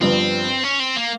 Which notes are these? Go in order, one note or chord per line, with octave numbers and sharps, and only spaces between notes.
G1 G2 F3 C4
C#4
C4
A#3